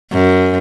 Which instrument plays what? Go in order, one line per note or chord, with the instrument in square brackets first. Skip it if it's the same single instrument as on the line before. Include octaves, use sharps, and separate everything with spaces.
[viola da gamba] F#2